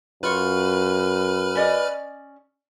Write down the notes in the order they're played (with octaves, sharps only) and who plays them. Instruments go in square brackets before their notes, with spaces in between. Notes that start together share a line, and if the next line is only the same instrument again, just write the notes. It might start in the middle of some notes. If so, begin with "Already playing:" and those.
[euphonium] F#2 [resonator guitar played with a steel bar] F4 C#5 [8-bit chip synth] B4 B5 F6
[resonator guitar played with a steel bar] C#4 D5 D#5